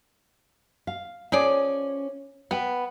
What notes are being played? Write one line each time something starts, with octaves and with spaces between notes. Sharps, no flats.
F5
F3 C#4 G#4 D5
B3 B4 G5